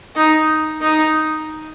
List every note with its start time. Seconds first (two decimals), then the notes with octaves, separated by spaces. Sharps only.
0.16 D#4
0.81 D#4